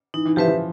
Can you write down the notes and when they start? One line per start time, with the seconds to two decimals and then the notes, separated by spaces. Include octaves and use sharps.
0.14 E3 D#4
0.25 E3
0.36 F3 G4 B4 E5
0.48 F3